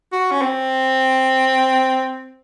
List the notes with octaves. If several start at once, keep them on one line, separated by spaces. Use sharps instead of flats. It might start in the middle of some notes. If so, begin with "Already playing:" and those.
F#4
C#4
C4